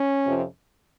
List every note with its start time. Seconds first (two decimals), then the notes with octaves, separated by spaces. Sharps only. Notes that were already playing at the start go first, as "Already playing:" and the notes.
Already playing: C#4
0.27 F2 C3 F3